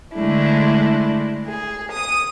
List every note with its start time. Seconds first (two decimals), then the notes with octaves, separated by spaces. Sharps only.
0.15 D3 G#3 A3 D4 E4
1.46 G#4
1.91 D#6